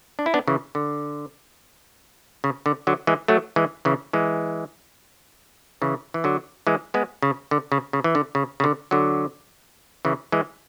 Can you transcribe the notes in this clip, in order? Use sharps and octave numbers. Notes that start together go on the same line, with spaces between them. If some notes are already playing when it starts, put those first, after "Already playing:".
D4
E4
B3 D4
C#3 E3
D3
C#3
D3
D3 F#3
E3 G#3
F#3 A3
E3 G#3
C#3 E3
E3 G#3
C#3 E3
E3
D3 F#3
E3 G#3
G#3 B3
C#3
D3
C#3
C#3
E3
D3
C#3
C#3
D3
D3 F#3
C#3 E3
E3 G#3